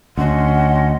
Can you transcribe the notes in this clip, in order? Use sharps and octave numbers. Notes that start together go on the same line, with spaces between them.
D2 C#4 D#5 F#5 C6